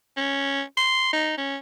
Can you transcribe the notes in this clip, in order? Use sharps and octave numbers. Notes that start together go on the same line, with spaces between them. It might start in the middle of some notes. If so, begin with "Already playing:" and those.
C#4
C6
D#4
C#4